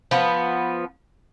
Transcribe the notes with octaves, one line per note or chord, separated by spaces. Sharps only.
F3 B3